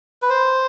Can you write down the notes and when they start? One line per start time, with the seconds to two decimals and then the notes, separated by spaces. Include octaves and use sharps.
0.22 B4
0.30 C5